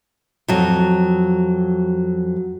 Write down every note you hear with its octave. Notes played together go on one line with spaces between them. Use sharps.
F2 F#3